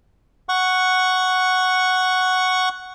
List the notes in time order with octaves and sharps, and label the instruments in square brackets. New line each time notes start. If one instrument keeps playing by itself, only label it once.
[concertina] F#5 C#6